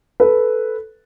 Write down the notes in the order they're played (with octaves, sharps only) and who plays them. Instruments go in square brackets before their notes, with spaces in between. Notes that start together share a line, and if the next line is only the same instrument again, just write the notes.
[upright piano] A4 B4